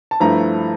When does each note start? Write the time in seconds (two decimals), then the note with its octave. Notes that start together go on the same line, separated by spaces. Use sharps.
0.11 A5
0.20 G2 F3 A3 E4 A#5